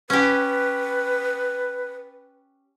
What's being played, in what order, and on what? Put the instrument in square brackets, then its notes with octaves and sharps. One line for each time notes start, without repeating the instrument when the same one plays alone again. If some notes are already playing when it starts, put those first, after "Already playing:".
[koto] C#4 G4 [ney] B4